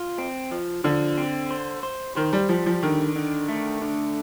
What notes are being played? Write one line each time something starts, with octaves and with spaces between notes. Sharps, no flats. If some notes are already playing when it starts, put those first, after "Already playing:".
Already playing: F4
C4
F3
D3 F3
C4
C5
C5
D#3 C5
G3
F3 G3
F3
D3 D#3
D3
A3
D3